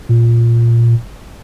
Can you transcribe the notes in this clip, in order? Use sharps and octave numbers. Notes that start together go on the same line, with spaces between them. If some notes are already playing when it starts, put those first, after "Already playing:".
A#2